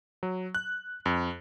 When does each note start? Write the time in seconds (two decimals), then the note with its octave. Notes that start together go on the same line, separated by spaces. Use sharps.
0.23 F#3
0.55 F#6
1.06 F2